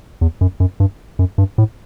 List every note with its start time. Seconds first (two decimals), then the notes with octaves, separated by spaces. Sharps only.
0.21 E2
0.41 F#2
0.60 F#2
0.80 G2
1.19 F#2
1.38 G2
1.58 A2